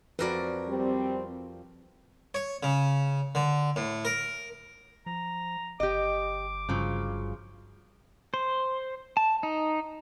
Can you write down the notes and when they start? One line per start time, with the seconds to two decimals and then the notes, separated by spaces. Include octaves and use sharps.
0.19 F2 F#4 A#4 B4 D5
0.68 G3 C4
2.34 C#5
2.63 C#3
3.35 D3
3.76 A2
4.05 A#4
5.06 F3 A#5
5.80 G1 G4 D#5 D6
6.69 G2 C#3 F3 F#3
8.34 C5
9.17 A5
9.43 D#4